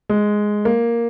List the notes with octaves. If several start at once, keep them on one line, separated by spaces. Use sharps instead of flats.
G#3
A#3